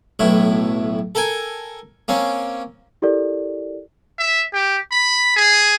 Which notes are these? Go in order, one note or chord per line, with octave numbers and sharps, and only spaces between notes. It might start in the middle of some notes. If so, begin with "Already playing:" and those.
B1 A2 E4
A4 A#4 G5 G#5
A#3 C4 C#4
E4 G4 A4 A#4 D5
E5
G4
B5
G#4